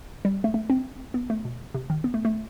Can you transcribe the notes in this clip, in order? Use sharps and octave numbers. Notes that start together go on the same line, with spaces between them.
G3
A3
A3
C4
B3
A3
B2
C3
D#3
B3
A3
A3